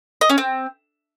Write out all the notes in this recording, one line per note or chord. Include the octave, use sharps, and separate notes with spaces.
D#5
C#4
C4